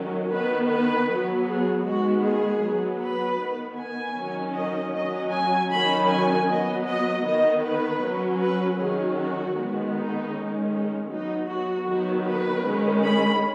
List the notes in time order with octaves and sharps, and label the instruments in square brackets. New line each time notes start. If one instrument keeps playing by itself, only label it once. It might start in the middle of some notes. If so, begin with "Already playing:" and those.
Already playing: [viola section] D#3 F#3 C#4
D#3 B3 B4
B4
F#3 B3
G#4
D#3 G#3 B3 F#4
G#4
F#3 B3
B4
D#3 B3
G#5
D#3 F#3 C#4
D#5
F#3 C#4 D#5
G#5
D#3 F#3 C#4 B5
G#5
F#3 B3 D#5
D#5
D#3 B3 D#5
B4
F#3 C#4
B4
D#3 F#3 C#4 G#4
F#4
D#3 G#3 B3
D#4
D#3 G#3 C#4
D#4
F#3 B3 D#4
F#4
D#3 F#3 B3 F#4
B4
D#3 G#3 C#4
B5